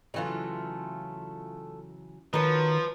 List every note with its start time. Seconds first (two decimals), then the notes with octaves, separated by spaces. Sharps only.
0.14 C#3 E3 F#3 A3 F4
2.33 D#3 F3 F#4 A#4 B4 C#5